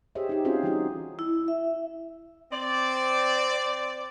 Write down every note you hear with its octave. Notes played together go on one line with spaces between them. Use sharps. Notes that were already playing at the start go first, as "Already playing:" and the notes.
G4 G#4 C5 C#5 D#5 E5
D#4 G4
C4 C#4 F4 F#4 G#4 C5
E3 G3 C#4 D#4 F#4 G#4
E4
E5
C4 D5